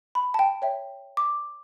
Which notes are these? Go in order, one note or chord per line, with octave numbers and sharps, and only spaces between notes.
B5
A5
G5
C#5 E5 G5
D6